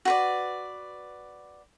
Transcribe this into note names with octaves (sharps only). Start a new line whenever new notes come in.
F#4 B4 D5